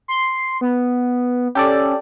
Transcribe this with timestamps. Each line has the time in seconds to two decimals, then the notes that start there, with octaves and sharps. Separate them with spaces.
0.08 C6
0.61 B3
1.55 C#4 G4 A4 D5